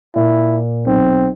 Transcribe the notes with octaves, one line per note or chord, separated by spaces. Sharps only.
A#2 E4
B1 C4